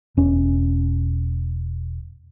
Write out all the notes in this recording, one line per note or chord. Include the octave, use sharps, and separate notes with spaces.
E1 C#4